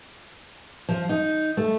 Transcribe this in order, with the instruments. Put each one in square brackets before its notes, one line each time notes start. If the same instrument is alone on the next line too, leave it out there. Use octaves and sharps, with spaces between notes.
[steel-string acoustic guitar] F3
D#4
A3